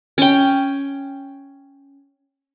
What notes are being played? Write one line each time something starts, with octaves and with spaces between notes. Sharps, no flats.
C#4 G5